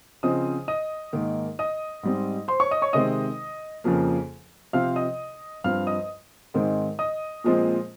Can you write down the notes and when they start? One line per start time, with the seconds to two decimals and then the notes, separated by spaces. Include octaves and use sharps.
0.23 C#3 F3 C4 D#5 D#6
0.68 D#5 D#6
1.13 G#2 D#3 A#3
1.59 D#5 D#6
2.03 G#2 G3 C4
2.48 C5 C6
2.60 C#5 C#6
2.71 D#5 D#6
2.82 C#5 C#6
2.93 C3 D#3 G#3 C4 D#5 D#6
3.84 F2 C#3 F3 A#3
4.73 C3 F3 C4 F5 F6
4.96 D#5 D#6
5.64 G2 F3 C4 F5 F6
5.87 D#5 D#6
6.54 G#2 D#3 G#3 C4
6.99 D#5 D#6
7.44 A#2 F3 G#3 C4